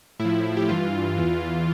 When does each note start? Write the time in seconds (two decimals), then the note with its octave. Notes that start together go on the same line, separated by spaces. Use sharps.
0.19 A2 E4
0.25 F3
0.57 G4
0.69 G2 E3 F4
1.18 E2 E3